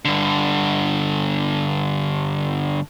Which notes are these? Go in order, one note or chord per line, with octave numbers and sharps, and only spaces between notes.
G2 D3